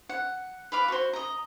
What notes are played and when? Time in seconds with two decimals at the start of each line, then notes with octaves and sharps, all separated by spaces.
0.09 F#5
0.72 B4 F5 D6
0.88 F#4 C5
1.13 D#5 A#5